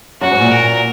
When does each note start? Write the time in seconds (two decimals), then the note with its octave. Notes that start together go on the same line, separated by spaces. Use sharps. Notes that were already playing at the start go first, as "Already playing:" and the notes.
0.21 F#2 F#4
0.31 G#2
0.41 A#2
0.51 A#4